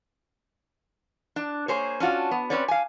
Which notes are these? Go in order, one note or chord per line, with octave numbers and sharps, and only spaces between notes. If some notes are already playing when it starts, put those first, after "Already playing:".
D4
A#3 G#4 C5 C#5
C#4 D4 F4 F#4
B3
C4 C#4 B4 C#5 D5
F5 G#5